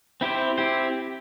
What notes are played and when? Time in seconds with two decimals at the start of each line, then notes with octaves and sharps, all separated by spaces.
0.21 C4 E4 G4 C5
0.58 C4 E4 G4 C5